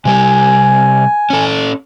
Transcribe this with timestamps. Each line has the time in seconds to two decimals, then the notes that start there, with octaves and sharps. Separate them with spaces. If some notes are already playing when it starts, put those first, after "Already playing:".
0.05 C3 G3 G4 G#5
1.30 C#4 A4